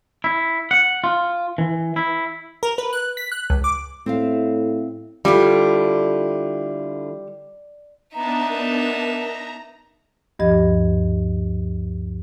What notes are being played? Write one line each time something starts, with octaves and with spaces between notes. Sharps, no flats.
E4
F#5
F4
E3
E4
A#4
B4
F#6
B6
F#6
C#2
D6
A2 C4 E5 F5
D3 G3 E4 F4
B3 D4 D#4 E5 A5 A#5
A#4
A#5
D2 G2 F3 G4 D#5 G#6